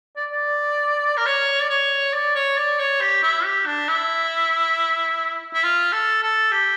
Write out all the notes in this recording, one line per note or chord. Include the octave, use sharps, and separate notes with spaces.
D5
D5
A#4
C#5
D5
C#5
D5
C#5
D5
C#5
G4
E4
G4
D4
E4
E4
F4
A4
A4
G4